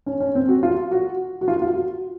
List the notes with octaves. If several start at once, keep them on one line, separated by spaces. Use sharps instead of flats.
C#4
C#4
C4
F#4
F4
F#4
F#4
F4
F4
F#4